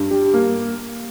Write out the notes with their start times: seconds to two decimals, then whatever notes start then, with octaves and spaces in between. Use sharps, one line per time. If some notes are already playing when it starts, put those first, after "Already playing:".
Already playing: G2
0.11 G3
0.34 A#3